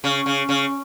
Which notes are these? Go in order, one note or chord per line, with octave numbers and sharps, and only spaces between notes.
C#3
C#3
C#3